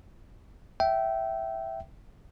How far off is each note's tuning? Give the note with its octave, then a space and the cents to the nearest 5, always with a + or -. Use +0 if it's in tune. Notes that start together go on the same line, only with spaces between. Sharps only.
E5 +0 G5 -20